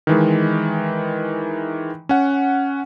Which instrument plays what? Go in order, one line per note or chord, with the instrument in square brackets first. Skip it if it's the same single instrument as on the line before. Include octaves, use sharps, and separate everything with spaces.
[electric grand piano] D#3 E3 G#3
C#4 F#5